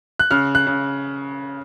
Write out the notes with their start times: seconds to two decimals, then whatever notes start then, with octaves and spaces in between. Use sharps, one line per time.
0.19 F#6
0.31 C#3 F6
0.55 F#6
0.67 C#3